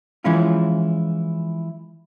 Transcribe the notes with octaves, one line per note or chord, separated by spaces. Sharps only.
E3 F3 G#3 C#4 E4 F4